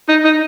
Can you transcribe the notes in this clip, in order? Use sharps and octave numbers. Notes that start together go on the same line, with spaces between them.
D#4
D#4